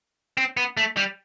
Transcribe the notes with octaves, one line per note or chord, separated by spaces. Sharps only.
C4
B3
A3
G3